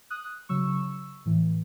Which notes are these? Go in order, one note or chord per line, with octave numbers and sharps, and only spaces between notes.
D#6 F#6
C#3 F#3 C#6 E6
A2 E3